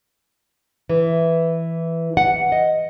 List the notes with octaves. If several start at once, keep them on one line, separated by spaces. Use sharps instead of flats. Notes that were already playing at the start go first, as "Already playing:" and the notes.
E3
F#5
D#5